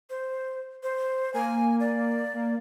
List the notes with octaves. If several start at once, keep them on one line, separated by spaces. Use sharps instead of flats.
C5
C5
A#3 G#5
D5
A#3